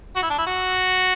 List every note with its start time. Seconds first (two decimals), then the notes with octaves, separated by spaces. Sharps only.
0.16 F#4
0.22 E4
0.30 D4
0.38 E4
0.47 F#4